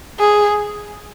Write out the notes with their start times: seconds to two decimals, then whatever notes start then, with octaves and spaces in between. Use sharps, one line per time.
0.19 G#4